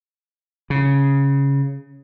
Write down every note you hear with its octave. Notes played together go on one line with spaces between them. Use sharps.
C#3